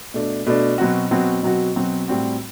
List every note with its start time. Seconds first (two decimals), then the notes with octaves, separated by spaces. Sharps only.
0.14 B2 A3 D4
0.46 B2 A3 D4
0.78 B2 F#3 C4 F#4
1.11 B2 F#3 C4 F#4
1.43 B2 F#3 C4 F#4
1.76 B2 F#3 C4 F#4
2.08 A2 G3 C4 F#4